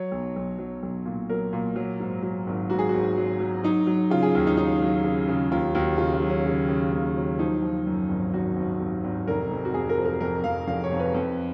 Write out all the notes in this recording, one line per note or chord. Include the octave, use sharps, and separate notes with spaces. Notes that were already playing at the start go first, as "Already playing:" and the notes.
Already playing: F#3 C#5
B1
B1
F#3
B1
A#2
F#3 A#4
A#2
F#3
G#2
F#3
G#1
G#2 F#4
G#4
F#4
G#1
F#3
F#3
F#3 D#4
F#3
C#3 F4
G#4
D#2
D#4
F#3 D#4
F#3
C#3
C#3
D#2 F4
D#2 F#4
C#3 F4
F4
F#3
C#4
C#3
C#3
D#2
F#3
F3 D#4
F3
F#2
G#1
G#1 F#4
G#1
G#1
G#1
F1 A#4
F2
F#4
F2 G#4
A#4
F3
A#4
F2 A#4
F2 F5
F1 F5
C#5
F2
B4
F2